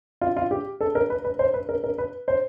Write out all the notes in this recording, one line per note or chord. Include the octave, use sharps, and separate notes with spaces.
F4
F4
G4
A4
A#4
B4
B4
C5
B4
A#4
A#4
B4
C5